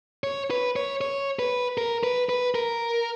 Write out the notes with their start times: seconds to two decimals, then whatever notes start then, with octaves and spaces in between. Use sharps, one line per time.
0.24 C#5
0.50 B4
0.76 C#5
1.01 C#5
1.39 B4
1.78 A#4
2.03 B4
2.29 B4
2.55 A#4